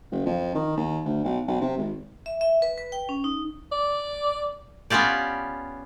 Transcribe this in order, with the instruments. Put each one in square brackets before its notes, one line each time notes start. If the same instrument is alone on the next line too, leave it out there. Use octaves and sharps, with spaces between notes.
[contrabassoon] F#1
F2
D#3
D#2
D2
B1
B1
C3
G#1
[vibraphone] E5
E5
B4
B4
G5
C#4
D#4
[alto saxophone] D5
[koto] B3 C#4 F4 G4 D5